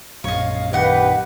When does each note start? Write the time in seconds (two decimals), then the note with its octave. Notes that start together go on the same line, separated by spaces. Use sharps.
0.24 A#1 F#2 C#5 D#5 F5
0.73 D#3 G4 B4 D#5 F#5